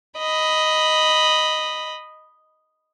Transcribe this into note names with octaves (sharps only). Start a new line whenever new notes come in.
D#5 B5